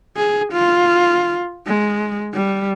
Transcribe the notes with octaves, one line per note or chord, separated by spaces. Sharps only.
G#4
F4
G#3
G3